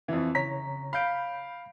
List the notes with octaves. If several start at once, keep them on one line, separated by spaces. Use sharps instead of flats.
F2 E3
C#3 C#5 A#5 B6
F5 B5 G6 D7